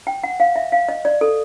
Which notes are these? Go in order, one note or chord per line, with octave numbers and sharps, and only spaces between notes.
G5
F#5
F5
E5
F5
D#5
D5
A4